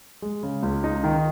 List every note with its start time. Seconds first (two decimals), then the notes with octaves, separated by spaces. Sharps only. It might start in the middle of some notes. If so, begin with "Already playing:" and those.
0.22 G#3
0.43 C#3
0.63 C#2
0.84 D#4
1.04 D#3